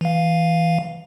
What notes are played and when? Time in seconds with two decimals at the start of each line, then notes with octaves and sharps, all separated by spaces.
0.01 E3 F5